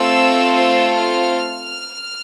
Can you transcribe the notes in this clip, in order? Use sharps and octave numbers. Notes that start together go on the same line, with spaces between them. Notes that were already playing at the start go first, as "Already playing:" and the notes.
Already playing: A3 C4 F4 A4 E6
E6
F6